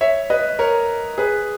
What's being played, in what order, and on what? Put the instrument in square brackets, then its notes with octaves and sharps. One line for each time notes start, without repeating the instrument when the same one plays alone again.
[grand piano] C#5 E5
B4 D#5
A#4 C#5
G#4 B4